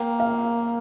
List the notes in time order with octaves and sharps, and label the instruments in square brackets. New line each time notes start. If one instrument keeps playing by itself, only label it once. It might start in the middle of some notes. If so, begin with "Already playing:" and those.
Already playing: [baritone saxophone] A#3 [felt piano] G5
[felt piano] F5